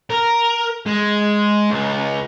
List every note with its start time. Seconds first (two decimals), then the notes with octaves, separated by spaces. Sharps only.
0.10 A#4
0.86 G#3
1.70 C#2